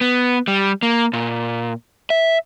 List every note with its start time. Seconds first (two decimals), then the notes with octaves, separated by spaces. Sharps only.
0.01 B3
0.48 G3
0.83 A#3
1.13 A#2
2.10 E5